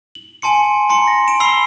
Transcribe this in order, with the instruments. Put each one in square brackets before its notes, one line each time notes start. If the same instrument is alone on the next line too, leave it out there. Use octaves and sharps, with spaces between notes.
[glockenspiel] F#7
G#5 A5 C6 C#7
A#5 C6 C#7 F#7
A#6
D7 E7
B5 E6 C7 F7 G7